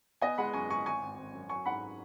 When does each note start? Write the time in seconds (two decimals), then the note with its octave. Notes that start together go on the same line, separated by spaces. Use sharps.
0.21 B3 D#5 G#5
0.38 G#3 F#5 B5
0.54 F#2 G#5 C#6
0.70 G#3 G#5 C#6
0.86 G#1 G#5 C#6
1.02 G#1
1.18 G#1
1.33 F#2
1.49 F#3 G#5 C#6
1.66 G#2 F#5 B5